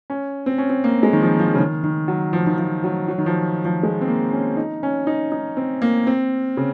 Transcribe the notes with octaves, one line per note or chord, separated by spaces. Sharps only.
C#4
C4
C#4
C4
A#3
G#3
D#3
F3
F3
C#3
D#3
D#3
F#3
F3
D#3
F3
F#3
F#3
D#3
F3
F3
G#3
C4
A#3
C#4
D#4
C#4
D#4
D#4
C4
A#3
C4
C#3